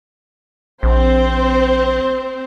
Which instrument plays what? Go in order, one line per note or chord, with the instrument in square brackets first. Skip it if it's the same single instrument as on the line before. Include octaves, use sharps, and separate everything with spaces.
[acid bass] A#1 [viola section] C4 C5